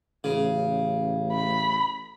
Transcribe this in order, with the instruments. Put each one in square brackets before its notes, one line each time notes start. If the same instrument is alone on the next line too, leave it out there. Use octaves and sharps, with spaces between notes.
[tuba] A1 [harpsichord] C#3
[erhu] B5